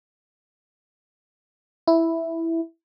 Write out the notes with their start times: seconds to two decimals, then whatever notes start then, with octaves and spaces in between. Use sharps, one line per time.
1.88 E4